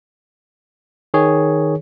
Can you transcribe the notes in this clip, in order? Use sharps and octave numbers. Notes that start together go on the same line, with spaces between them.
D#3 G#4 C#5